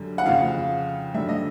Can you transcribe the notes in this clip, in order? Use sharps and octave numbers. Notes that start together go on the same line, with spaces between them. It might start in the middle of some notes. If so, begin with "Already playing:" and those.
Already playing: F#2 D3 G3
F#5
F2 C#3 F3 F5
G2 D3 F#3 E5
D#5